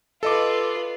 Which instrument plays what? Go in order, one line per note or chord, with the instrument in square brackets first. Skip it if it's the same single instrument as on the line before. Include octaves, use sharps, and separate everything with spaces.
[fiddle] F4 B4 [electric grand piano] A4 D#5 D6